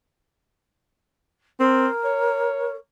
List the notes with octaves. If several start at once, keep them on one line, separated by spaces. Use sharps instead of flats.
C4 A#4
C#5